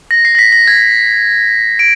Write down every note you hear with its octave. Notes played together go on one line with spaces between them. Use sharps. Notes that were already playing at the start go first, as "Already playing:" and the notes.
A#6
C7
A#6
B6
A#6
G#6
D7